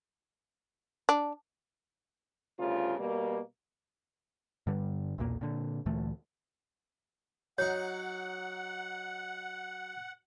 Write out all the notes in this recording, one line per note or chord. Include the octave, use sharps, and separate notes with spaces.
D4
D2 G2 C#3 F4
B2 G3 A#3
G2 D3 G3
B1 E2 A#2 A#3
A#2 D3
D2 A#2 E3 A3
F#3 D#4 C#5 F#5